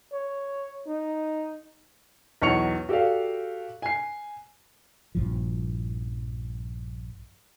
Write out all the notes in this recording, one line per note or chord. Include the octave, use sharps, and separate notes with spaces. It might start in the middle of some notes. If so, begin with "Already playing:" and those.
C#5
D#4
B1 E2 C#5 C#6 C#7 F7
F#4 G4 A4 D5 F5
G#5 C7
A#1 G2 F3